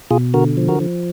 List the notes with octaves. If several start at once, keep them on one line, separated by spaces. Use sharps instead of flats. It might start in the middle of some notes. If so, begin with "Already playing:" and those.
B2 F4 G#4
D3 F#4 A#4
F3
F#4 A#4
F3